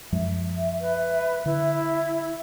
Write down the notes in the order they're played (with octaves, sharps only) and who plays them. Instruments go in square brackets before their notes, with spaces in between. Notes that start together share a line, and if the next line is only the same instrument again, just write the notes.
[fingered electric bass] F#2 F3 G#3 [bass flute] E5
[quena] B4
[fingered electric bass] D3 [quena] E4